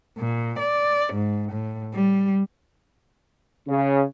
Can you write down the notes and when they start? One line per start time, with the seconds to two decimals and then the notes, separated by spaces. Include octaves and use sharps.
0.18 A#2
0.59 D5
1.13 G#2
1.53 A2
1.95 G3
3.68 C#3